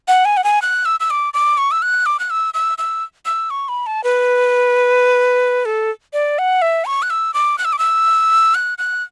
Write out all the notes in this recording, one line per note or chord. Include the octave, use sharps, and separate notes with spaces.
F#5
G#5
F#5
G#5
F#6
E6
E6
D6
D6
C#6
E6
F#6
D6
F#6
E6
E6
E6
E6
C#6
B5
A5
B4
A4
D5
F#5
E5
C#6
F#6
E6
D6
F#6
E6
D6
E6
F#6
F#6